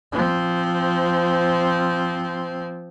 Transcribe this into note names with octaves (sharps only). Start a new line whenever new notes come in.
F3 C4